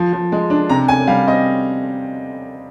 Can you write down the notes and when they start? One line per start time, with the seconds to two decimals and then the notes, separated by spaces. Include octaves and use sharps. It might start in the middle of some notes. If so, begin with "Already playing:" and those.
Already playing: F3
0.13 F3
0.32 G#3
0.50 D4
0.69 C3 A#5
0.88 C3 G#5
1.07 G3 F5
1.27 C4 D#5